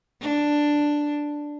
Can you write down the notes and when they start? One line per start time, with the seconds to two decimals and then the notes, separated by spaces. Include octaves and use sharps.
0.22 D4